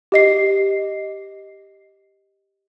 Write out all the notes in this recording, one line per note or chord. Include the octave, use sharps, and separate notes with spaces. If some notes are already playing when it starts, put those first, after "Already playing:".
G4 D#5 C7